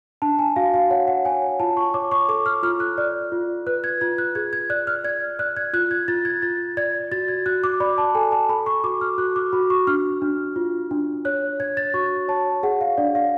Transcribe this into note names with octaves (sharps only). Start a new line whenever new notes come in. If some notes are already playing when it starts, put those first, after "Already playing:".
D4 A5
G#5
F#4 F5
F5
C#5 F#5
F#5
C#5 G#5
F4 A5
C#6
C#5 D6
C#6
A4 D6
F6
F4 F6
F#6
D5
F4
B4 F#6
G#6
F4 G#6
F#6
G#4 G#6
G#6
D5 F#6
F6
D5 G#6
D5 F#6
G#6
F4 F#6
G#6
F4 A6
G#6
F4 A6
D5 G#6
F#4 A6
G#6
F#4 F#6
D6
D5 B5
A5
A4 G#5
A5
A4 B5
C#6
F#4 D6
F6
F#4 F#6
D6
F#4 B5
C#6
D4 F6
D4
F4
D4
C#5 F#6
C#5 G#6
A6
F#4 C#6
C#5 A5
G#4 F#5
F5
D4 D5
F5